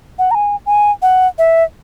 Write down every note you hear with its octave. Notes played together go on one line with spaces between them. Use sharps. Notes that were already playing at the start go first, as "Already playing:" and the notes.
F#5
A#5
G#5
G#5
F#5
E5